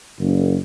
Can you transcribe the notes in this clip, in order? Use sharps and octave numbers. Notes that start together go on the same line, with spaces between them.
F#1